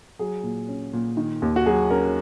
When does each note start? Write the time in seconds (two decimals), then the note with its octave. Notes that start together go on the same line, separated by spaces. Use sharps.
0.19 F#3 G#4
0.43 A#2
0.69 C#4
0.93 A#2
1.17 D#3
1.42 D#2
1.56 F#4
1.66 F#3 G#4
1.90 C#4 A#4